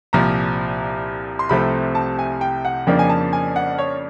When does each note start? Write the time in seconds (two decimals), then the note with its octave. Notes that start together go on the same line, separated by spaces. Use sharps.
0.13 C2 A#2 F3 A#5
1.39 C6
1.49 C2 C3 F3 A3 C4 B5
1.95 A5
2.19 G#5
2.41 G5
2.65 F#5
2.87 F2 C#3 F3 A#3 D4 G5
2.99 G#5
3.10 A5
3.33 G#5
3.56 F#5
3.78 C#5